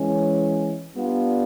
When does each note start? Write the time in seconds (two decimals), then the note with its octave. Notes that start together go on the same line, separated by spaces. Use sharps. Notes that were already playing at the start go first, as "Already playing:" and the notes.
Already playing: E3 G#3 C#4
0.97 G3 B3 D4 F4